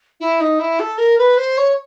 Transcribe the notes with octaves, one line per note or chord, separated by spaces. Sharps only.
E4
D#4
E4
A4
A#4
B4
C5
C#5